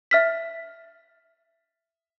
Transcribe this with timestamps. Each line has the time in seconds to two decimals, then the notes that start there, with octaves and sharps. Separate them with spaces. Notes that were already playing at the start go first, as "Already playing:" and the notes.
0.11 E5 F6 B6